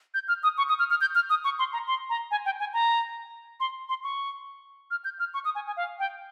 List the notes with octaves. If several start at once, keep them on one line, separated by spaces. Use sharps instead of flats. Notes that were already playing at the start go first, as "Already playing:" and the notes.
G6
F6
D#6
C#6
D#6
F6
F6
G6
F6
D#6
C#6
C6
A#5
C6
A#5
G#5
G5
G#5
A#5
C6
C6
C#6
F6
G6
F6
C#6
D#6
G#5
G#5
F5
G5